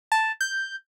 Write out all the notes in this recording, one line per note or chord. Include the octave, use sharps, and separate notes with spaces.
A5
G6